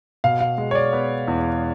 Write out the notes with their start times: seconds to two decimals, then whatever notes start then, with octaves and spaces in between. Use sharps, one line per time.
0.24 B2 F5
0.40 F5
0.58 G#3
0.71 C#5
0.75 D5
0.93 B3
1.28 E2